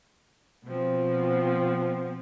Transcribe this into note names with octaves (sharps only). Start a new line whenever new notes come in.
B2 F3 C4